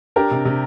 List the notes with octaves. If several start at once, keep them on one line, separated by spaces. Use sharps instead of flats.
D4 G4 A#4
C3
C3